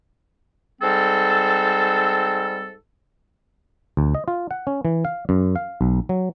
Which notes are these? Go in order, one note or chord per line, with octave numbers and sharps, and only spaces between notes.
G#2 G3 C4 A4
D2
D#5
F4
F#5
C#4
E3
F5
F#2
F5
B1
F#3